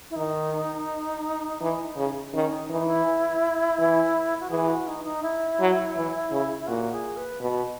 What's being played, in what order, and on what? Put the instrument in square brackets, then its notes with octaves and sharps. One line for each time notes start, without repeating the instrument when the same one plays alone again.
[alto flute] E4
[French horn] D#3 [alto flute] D#4
[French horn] E3
C#3
[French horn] D#3 [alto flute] C#4
[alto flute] D#4
[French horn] E3 [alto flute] D#4
[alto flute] E4
[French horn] E3
[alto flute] F#4
[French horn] E3 [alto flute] G#4
[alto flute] F#4
D#4
D#4
E4
[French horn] F#3
E3
C#3
[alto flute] E4
[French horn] A#2 [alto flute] F#4
[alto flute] G#4
B4
[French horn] B2